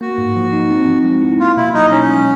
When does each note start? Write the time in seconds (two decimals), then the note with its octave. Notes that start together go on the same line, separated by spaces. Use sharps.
0.01 A#3 F#4
0.18 G#2
0.36 F3
0.53 D#4
0.71 C4
0.88 F3
1.05 G#3
1.22 E4
1.40 A#3 F4
1.57 B2 E4
1.74 F#3 D#4
1.91 C#4 D#4
2.08 G#3